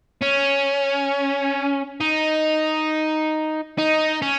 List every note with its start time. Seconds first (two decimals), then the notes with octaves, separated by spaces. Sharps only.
0.22 C#4
2.00 D#4
3.78 D#4
4.22 C#4